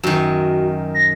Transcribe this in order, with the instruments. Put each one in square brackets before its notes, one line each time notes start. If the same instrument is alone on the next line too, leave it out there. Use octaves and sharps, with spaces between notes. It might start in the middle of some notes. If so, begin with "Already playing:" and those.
[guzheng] F#2 D#3 [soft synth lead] F#4
[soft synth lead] A#6